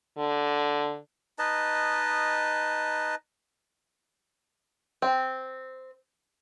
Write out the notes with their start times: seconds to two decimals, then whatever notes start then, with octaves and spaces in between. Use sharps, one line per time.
0.18 D3
1.39 D#4 B4 D#5 A5
5.02 C4